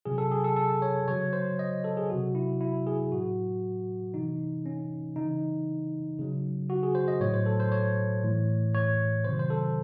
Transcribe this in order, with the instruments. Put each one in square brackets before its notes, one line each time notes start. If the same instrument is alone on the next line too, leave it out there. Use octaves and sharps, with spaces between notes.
[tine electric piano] C3 F#3 G#4
A4
G#4
A4
A4
C#5
C#3 F#3 C#5
C5
D#5
A4
G#4
C3 F#3 F#4
E4
E4
G#4
A2 F#3 F#4
C3 E3 D#4
C#4
C#3 E3 D#4
C#3 F#3
F#4
G#4
C5
D#5
A2 F#3 C#5
C5
A4
C5
C#5
A2 E3
C#5
C3 D#3 F#3 C5
C5
A4